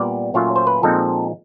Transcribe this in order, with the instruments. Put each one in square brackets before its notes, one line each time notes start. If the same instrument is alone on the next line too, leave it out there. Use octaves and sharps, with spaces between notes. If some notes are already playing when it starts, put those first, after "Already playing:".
Already playing: [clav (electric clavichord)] A#2 G3 B3 D5
A#2 F#3 A3 C#4 F4 C#5
C5
B4
A#2 F3 G#3 C4 D#4 A4